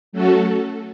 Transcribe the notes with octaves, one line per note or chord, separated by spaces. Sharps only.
F#3 A3 C#4 F#4 A4